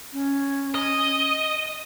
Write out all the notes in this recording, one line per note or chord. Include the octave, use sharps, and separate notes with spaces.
C#4
D#5